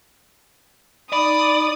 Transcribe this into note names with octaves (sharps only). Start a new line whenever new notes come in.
D#4 D5 B5 D#6